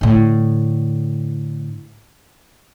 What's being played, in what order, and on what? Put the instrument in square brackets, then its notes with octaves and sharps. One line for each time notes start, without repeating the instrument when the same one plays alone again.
[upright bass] A2 D3